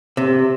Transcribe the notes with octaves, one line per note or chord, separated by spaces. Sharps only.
C3